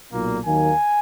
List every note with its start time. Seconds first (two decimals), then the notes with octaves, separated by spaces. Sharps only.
0.11 B1 A#2 A#3
0.45 D#2 D#3 F#3 A#3 G#5